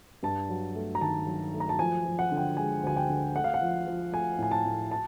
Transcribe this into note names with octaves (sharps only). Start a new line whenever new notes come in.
G2 A5
F#3
A3
A#5
D#3 A5
F#3
A3
A#5
A5
F3 G#5
F3
F#5
D3
G5
G#3 G#5
D2 G#5
G5
D3
A3 F#5
F5
F#5
F3
F3
A3 G#5
A2 G#5
A5
A2
A5